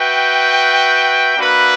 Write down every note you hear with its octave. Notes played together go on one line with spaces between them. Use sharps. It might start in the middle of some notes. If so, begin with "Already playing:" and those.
Already playing: F#4 B4 E5 G5
A#3 D4 F#4 B4 E5